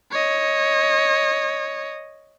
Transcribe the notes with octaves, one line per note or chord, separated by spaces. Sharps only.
C#5 D#5